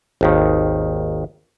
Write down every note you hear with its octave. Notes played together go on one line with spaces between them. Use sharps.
G#1 D#2 D#3